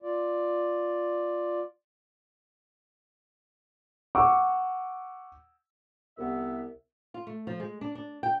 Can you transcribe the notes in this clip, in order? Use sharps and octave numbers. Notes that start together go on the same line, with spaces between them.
F4 D5
F#5 C#6 D6 E6
C2 B3 E5
F4
A3
F3
G#3
D4
D4
G5